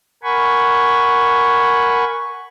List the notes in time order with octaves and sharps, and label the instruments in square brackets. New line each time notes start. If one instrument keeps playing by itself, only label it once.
[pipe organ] A#4 F#5 G#5 B5 C#6